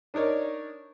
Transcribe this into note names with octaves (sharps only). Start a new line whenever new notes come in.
D4 D#4 A#4 C#5 D5